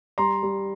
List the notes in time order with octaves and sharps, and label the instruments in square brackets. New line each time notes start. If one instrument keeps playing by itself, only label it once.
[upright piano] G3 A#5 C6
G3